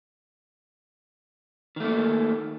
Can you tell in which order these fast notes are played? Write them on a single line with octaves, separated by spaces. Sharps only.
D#3 A3 A#3